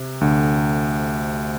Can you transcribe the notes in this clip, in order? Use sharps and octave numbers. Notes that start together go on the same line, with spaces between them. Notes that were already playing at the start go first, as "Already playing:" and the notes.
Already playing: C3
D2 D3